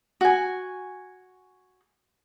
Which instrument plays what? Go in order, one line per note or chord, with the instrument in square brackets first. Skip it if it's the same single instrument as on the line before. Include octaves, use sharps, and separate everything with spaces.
[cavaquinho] F#4 G#5